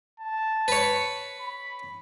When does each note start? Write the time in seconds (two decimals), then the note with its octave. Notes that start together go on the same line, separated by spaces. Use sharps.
0.20 A5
0.68 B4 C#5
1.40 B5